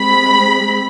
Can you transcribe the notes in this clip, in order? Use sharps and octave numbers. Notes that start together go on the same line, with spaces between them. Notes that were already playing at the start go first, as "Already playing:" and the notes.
Already playing: G#3 C4 B5